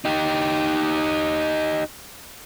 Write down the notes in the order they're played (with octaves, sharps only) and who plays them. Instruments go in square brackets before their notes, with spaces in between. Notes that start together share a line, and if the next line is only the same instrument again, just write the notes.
[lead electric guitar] D#4 G4